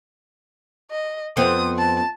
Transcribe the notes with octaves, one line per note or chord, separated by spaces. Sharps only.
D#5
F2 B3 C4 D#6
A5